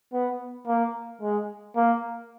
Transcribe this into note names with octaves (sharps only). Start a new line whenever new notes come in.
B3
A#3
G#3
A#3